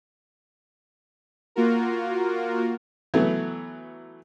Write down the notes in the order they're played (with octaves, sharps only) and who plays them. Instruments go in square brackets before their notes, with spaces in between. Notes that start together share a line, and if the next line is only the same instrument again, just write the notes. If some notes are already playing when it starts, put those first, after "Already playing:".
[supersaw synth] A#3 F4 F#4 A#4
[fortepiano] E3 F#3 A3 B3